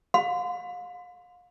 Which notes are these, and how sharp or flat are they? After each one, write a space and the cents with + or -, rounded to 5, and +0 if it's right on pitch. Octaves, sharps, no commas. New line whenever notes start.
F5 +35 C6 -35